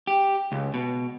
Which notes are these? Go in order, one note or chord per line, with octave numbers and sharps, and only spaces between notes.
G4
C#2
B2